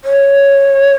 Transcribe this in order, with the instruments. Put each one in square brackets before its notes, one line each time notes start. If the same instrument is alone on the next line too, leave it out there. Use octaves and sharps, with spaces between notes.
[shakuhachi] C#5